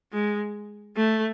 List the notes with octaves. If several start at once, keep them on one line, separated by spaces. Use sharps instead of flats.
G#3
A3